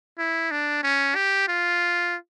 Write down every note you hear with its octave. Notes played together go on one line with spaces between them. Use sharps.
E4
D4
C#4
G4
F4